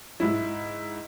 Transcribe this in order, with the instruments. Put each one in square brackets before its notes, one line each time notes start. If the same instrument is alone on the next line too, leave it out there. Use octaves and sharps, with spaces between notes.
[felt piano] G#2 E4